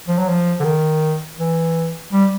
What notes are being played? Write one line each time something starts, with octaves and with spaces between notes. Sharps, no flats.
F3
F#3
F3
D3
D#3
E3
G3